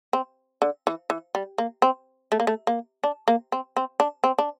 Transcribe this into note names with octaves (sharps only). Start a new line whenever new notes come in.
C4
D3
E3
E3
G3
A#3
C4
A3
A#3
A3
A#3
D4
A#3
C4
C4
D4
C4
D4